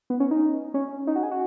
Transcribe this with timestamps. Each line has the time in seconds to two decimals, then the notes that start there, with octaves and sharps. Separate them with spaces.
0.10 B3
0.20 C#4
0.31 D#4
0.74 C#4
1.07 D#4
1.16 F#4
1.23 G#4
1.31 F#4